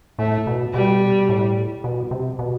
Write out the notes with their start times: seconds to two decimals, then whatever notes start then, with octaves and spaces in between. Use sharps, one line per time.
0.19 A2 A3
0.47 B2
0.74 B2 G3
1.29 A2
1.84 B2
2.11 C3
2.39 B2